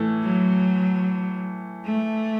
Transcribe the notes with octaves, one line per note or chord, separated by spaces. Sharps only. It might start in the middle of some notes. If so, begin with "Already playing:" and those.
Already playing: A2 E3 A3
F#3
A3